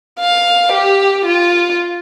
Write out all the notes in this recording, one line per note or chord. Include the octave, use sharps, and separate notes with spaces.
F5
G4
F4